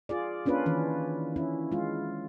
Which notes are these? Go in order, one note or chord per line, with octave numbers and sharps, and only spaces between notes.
F4 G#4 D5
A#3 C#4 D4 F4 B4
D#3 E3 C#4
C#4 E4
G#3 F4